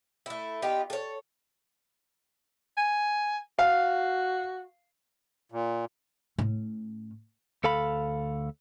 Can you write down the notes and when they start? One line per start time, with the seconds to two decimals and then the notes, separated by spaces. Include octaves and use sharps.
0.26 A3 E4
0.62 B3 D#4 F4 G4
0.90 A4 C#5
2.77 G#5
3.59 F#4 F5
5.52 A#2
6.38 A2 C#4
7.64 D2 A4 F5 B5